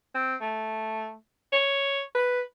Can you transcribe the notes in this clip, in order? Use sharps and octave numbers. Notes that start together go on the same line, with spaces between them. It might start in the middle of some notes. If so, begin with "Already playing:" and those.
C4
A3
C#5
B4